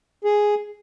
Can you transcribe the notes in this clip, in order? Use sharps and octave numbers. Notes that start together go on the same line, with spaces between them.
G#4